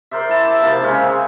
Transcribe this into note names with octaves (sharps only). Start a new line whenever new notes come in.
A#4 C5 D5 E5
E4 A5
D6
C3 F3 A#3
C#3 G#3 C4 C#4
G#4